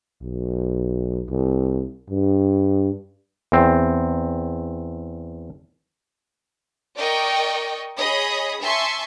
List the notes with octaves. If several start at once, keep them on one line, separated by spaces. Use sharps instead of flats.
B1
C2
G2
E2 C4
A#4 D5 D#5 G5 C#6
G#4 C#5 D#5 B5 D#6
E5 G#5 A5 C6 C#6